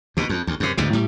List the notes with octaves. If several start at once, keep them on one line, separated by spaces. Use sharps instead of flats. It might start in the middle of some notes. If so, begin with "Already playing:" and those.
D2 B2
F2
D2
F#2 C3
D2 G#2 B2
A2 G3